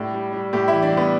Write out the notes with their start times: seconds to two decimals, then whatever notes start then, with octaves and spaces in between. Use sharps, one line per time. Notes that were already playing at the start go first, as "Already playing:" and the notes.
Already playing: A2 G3 D4
0.14 G3
0.33 G3
0.53 A2 G4
0.68 E4
0.73 E3
0.83 D4
0.93 G3 B3